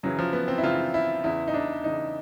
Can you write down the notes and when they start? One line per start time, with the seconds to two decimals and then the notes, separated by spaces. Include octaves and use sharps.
0.03 F#2 C#3 E3 F#3
0.19 F3
0.33 B3
0.48 C4
0.58 E4
0.63 F#2 C#3 E3 F4
0.94 E4
1.24 E2 C#3 E3 E4
1.48 D#4
1.54 D4
1.84 E2 C#3 E3 D#4